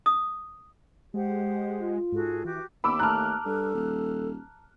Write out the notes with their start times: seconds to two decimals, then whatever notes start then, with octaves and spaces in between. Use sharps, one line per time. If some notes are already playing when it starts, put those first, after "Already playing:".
0.06 D#6
1.14 G#3 G4 C5 F#5
1.80 F4
2.12 G#2 F#4 G#4 A4
2.45 E3 F#4 G4 D6
2.84 D#2 B3 B5 D6 E6
2.99 A3 A5 A#5 F6 F#6
3.45 G2 A4
3.75 D#1